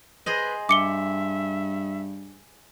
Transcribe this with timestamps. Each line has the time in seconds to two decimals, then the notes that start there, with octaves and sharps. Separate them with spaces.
0.26 G#4 B4 C5 D#5
0.69 G2 E5 D6 C#7 G7